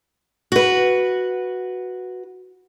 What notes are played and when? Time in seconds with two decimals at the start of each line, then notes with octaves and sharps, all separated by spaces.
0.52 F#4 B4